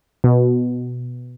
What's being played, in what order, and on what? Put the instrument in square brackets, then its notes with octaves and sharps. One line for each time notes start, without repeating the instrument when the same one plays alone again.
[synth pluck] B2